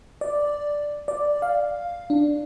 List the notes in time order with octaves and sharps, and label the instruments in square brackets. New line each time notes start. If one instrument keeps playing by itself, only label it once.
[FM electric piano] D5
D5
F5
D4